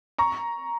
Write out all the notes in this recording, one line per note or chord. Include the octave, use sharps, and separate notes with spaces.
A#5 C#6